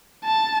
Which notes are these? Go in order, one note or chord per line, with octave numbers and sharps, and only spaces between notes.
A5